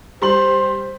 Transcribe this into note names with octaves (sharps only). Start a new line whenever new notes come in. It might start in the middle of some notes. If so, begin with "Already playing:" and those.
G3 C5 C6 F#7